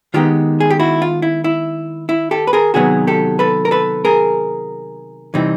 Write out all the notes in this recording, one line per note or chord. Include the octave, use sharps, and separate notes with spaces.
D#3 G#3 B3 D#4 F4 G4
G#4
G4
E4 F#4
F4
E4
E4
E4
G4 A4
B4
G#4 A#4
C3 D#3 F#3 B3 F#4 G#4
G4 A4
A4 B4
A#4
A4 B4
G#4 A#4
C3 E3 G3 C4 D#4